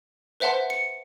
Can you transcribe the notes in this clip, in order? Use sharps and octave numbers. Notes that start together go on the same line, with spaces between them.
B4 C5 E5 F#5 A5 C6
C#7